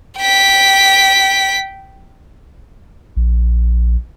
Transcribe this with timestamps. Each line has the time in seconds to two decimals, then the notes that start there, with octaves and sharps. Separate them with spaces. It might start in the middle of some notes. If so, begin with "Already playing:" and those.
0.18 G5 B6
3.16 A#1